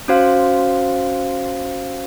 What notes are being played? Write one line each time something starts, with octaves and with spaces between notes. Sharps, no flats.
C#4 F#4 C5 F5